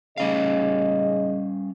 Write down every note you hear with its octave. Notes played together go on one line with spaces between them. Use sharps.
G#2 C#3 G3 C#4 D#5 F5